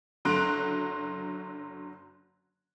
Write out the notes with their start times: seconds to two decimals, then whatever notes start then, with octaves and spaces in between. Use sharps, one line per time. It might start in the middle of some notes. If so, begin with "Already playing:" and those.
0.25 F#1 D3 F#3 C6 F#6 D7